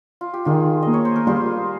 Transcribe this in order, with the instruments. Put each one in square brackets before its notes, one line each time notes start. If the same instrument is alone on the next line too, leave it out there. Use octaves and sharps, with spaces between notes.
[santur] F4
G4
[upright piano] D#3 [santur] F4 G#4
[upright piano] A#3 [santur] D#5
[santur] C#5
C5
A#4
[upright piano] G3 [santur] F4 G#4